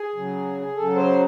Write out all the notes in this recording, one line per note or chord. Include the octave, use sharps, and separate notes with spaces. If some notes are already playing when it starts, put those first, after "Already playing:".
Already playing: G#4
C#3 F#3
C#3 F#3 A4
C5